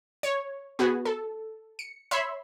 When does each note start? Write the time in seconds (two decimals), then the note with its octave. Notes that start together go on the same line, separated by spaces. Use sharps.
0.23 C#5
0.79 B3 F#4 G#4 B4
1.05 A4
1.79 C#7
2.11 C#5 E5 B5 C6